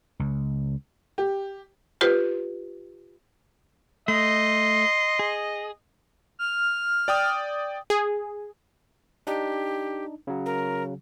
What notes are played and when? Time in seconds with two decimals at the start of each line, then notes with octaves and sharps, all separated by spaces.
0.19 C#2
1.18 G4
2.01 F4 G4 B4 C5
4.08 A3 D#5 C6
5.19 G#4
6.39 F6
7.08 D5 G5 D#6
7.90 G#4
9.27 D4 D#4 G4
10.27 C#3 F#3
10.46 A#4